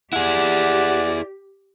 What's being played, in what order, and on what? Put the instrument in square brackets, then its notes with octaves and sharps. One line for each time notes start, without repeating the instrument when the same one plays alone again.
[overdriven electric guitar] E4 G#4 [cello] G4 [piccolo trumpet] D5 [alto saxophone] F#5